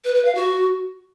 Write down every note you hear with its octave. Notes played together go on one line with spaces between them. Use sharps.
B4
B4
F5
F#4